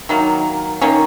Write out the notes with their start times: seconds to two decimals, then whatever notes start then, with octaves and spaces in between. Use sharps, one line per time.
0.09 D#3 F#3 A#3
0.82 D#3 A#3 C#4